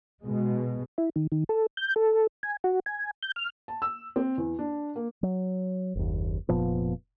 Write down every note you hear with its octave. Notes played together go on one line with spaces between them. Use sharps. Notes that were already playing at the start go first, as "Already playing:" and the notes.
B2 G#3
E4
D#3
D#3
A4
G6
A4
G#5
F#4
G#5
G6
F6
A5
E6
C4
E2
D4
A#3
F#3
F#1 D#2
F1 A#2 F3 B3